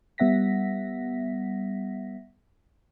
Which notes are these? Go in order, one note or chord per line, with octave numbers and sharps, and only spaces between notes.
G3 B3 E5 F#5 A#6 B6